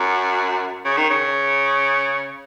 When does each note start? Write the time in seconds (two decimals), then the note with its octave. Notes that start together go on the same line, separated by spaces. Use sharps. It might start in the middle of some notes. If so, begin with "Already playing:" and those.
Already playing: F#2
0.85 C#3
0.97 D#3
1.10 C#3